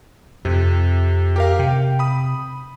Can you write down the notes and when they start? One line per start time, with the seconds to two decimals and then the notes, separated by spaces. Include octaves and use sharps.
0.45 F2 C3
1.36 G4 A#4 F5
1.59 C3 G5
1.99 B5 D#6